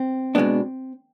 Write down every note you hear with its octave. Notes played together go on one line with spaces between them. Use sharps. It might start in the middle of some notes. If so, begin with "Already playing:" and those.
Already playing: C4
B2 G#3 B3 D4